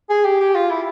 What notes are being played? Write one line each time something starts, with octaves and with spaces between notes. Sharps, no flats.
G#4
G4
G4
F4
E4